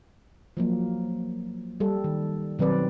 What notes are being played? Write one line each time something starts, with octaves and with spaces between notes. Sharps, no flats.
F3 F#3 A#3
G3 A4
D#3
B2 D#3 F#3 C4 B4 D5